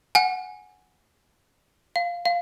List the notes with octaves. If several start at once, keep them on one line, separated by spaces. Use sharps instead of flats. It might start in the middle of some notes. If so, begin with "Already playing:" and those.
F#5 G#5
F5
F5